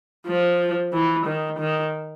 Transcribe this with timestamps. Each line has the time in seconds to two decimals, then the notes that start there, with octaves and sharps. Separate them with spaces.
0.27 F3
0.93 E3
1.26 D#3
1.59 D#3